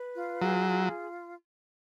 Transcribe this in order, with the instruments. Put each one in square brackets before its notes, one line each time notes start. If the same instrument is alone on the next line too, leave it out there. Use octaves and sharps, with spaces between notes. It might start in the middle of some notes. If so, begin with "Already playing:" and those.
Already playing: [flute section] B4
F4
[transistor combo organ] F#3 [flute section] G#4
[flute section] F4